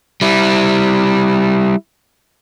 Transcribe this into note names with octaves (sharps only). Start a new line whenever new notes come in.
G3 E4